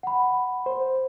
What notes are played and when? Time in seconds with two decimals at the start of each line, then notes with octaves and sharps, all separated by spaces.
0.03 F#5 B5
0.66 C5